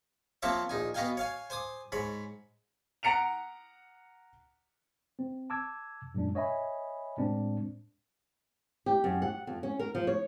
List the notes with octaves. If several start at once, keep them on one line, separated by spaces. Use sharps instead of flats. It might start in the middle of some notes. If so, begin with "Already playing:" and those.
F3 A#3 C4 C#5 E5 D6
A#1 D#4 G#5
B3 F#4 D#5 F5 G5 G#5
C#5 F5 G#5
C5 G#5 D6 D#6
G#2 C#5 B5
F#5 A#5 C#7 D7 F7
C4
A5 D6 E6 G#6
F#2 A#2 G#3 D4
C#5 D#5 E5 G#5 B5
A2 G#3 C4 D4
G4
F#2
F#5
F2
C#4
A#4
F3
C#5